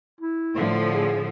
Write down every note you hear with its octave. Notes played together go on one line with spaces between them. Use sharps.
E4
A2 D3 F3
G#4